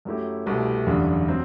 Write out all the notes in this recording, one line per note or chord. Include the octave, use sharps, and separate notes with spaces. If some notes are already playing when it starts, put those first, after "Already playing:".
F#2 F#3 A3 E4 G4
C2 B2 A3 E4 G4
F#1 E2 D3 G3
F#3 C4